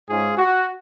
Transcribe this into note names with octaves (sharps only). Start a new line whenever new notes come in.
G#2 G#3 C#4 F4 G#4
F#4